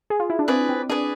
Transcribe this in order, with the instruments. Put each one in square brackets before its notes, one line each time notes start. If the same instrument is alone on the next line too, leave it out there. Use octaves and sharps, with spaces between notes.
[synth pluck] G#4
F4
E4
D4
[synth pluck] C4 [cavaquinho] G#4 B4 D5
[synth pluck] C4
[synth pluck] D4 [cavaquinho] G#4 B4 D5